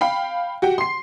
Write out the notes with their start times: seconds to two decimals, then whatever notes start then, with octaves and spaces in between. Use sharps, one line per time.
0.01 F5 G5 B5
0.62 F#4 G4 F#5 G5
0.78 C6 C7